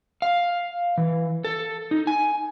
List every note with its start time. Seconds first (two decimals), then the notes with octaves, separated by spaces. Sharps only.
0.22 F5
0.98 E3
1.45 A4
1.91 D#4
2.07 G#5